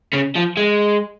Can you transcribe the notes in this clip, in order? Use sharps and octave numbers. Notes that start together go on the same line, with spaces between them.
C#3
F3
G#3